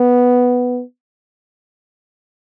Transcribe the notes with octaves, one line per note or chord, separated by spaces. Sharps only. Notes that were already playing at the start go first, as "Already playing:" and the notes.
Already playing: B3